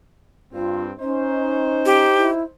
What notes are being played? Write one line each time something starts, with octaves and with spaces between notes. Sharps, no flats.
G2 C4 F4
C#4 D#4 C5
G4
E4